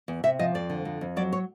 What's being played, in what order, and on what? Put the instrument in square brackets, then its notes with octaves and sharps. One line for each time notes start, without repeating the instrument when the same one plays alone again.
[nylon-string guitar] E2
C3 E5
F3 D#5
F2 D5
D3
F2
F2
F#3 D5
C#5